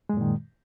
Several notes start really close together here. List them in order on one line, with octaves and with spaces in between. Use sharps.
G#3 F#2 A#2 D#3